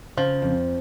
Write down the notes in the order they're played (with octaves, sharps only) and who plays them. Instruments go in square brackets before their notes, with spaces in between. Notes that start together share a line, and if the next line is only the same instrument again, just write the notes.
[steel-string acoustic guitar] C#3 [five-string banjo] F3
[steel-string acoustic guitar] F2